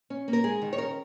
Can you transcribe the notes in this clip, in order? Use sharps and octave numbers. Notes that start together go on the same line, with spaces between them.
C#4
A#3
A#4
G#3 G#4
D#3
C#5
C#4 A#4